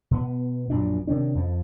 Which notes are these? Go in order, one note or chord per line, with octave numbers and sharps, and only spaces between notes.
B2 B3
A#1 F#2 A#2 D4
C3 D#3 C#4 D4
F2 F3